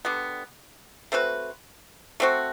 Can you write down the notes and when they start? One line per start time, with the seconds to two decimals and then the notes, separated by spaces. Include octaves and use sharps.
0.05 D3 G3 B3
1.12 A3 C4 F#4 B4
2.20 A3 C4 F#4